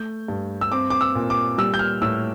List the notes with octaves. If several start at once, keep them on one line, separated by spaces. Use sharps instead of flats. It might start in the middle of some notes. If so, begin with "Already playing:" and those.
Already playing: A3 G6
G2
E6
C4 D6
D6
E6
A#2
D6
G3 E6
G6
F6
A2 E6